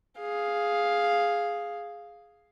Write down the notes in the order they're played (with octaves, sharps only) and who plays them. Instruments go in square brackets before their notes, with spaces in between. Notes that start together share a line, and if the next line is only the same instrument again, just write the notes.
[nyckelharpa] G#4 F5